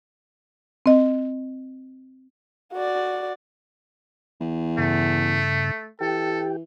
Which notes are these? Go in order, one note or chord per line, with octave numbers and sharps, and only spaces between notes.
C4 D#5
F#4 D5
E2
G2 C#3 A3
E3 G4 A4 G5